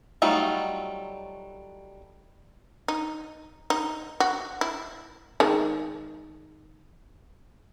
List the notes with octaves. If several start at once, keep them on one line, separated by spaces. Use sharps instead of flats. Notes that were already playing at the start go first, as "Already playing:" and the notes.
F#3 G3 A3 D#4 F4
D#4
D#4
F#4
E4
D#3 G#3